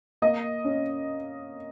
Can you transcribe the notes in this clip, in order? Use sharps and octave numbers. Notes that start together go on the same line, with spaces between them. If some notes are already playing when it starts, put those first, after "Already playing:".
A#3 D#5
C#4